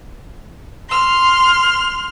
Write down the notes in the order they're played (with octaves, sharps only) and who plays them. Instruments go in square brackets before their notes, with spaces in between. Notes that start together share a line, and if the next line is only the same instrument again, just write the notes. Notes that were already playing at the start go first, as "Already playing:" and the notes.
[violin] C6 F6